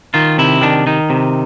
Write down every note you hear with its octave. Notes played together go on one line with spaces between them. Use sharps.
D#3 F4
C3 E4
D#3 D4
D#3 D#4
C3